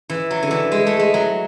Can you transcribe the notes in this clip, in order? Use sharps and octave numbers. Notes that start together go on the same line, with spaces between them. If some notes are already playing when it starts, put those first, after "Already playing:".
E3
F#3
D3
E3
G#3
A3
G#3
F#3